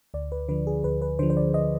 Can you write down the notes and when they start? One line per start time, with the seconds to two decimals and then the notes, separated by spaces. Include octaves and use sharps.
0.14 D2 D5
0.32 B4
0.48 D3 F3 B4
0.67 G#4
0.84 D2 B4
1.02 B4
1.19 D3 F3 C5
1.30 C5
1.37 D5
1.54 D#5